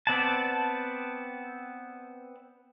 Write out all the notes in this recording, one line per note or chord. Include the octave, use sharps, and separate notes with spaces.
B3 C4 D5 F#5 A5